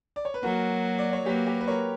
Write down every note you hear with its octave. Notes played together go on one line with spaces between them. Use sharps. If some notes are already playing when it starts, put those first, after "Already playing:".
D5
C#5
B4
F#3 A#3 F#4 A#4
D5
C#5
F#3 A#3 G4 B4
G4 B4
B4
A#4 C#5